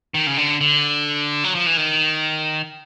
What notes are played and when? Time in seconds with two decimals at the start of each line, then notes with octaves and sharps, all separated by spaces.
0.14 D#3
0.27 C#3
0.37 D3
0.61 D3
1.44 F#3
1.55 F3
1.66 E3
1.77 D#3